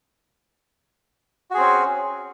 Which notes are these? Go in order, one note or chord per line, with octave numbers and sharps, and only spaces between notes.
C4 C#4 F#4 G#4